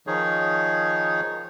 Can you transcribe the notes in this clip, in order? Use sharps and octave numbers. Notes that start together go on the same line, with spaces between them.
D#3 F3 D#4 G#4 C#5